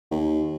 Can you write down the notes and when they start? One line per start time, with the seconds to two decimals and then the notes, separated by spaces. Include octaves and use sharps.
0.11 D#2